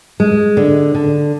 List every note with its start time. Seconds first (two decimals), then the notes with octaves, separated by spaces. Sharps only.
0.20 G#3
0.57 D3
0.95 D3